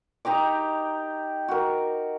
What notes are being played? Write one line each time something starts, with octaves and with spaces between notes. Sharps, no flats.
D#4 G4 A#5 D6
F#4 A#4